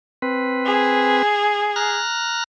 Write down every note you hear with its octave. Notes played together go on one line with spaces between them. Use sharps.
C4 B4
G#4
A#5 F6 F#6